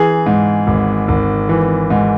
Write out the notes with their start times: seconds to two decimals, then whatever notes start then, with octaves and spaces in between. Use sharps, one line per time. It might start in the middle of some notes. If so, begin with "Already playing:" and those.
Already playing: E3 G#4
0.26 G#2
0.67 G#1
1.08 G#1
1.49 E3
1.90 G#2